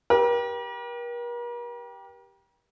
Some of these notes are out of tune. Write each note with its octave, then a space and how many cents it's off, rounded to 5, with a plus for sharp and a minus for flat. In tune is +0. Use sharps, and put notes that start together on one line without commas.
G4 +0 A#4 +45